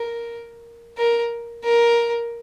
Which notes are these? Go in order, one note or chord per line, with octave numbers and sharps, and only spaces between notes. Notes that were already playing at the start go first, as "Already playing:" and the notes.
Already playing: A#4
A#4
A#4